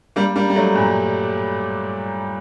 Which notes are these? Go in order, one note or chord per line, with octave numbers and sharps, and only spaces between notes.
G3 A#3
G3 A#3
G3
F#3 A3
G2 A#2